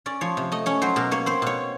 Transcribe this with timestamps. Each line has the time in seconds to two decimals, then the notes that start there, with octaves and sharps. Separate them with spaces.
0.06 C#4 D5
0.21 F3 C#5
0.37 C3
0.52 A3 D#5
0.66 C#4 C#5
0.82 F#3 C5
0.96 B2 A#4
1.11 A#3 C#5
1.26 C4 C5
1.42 B2 C#5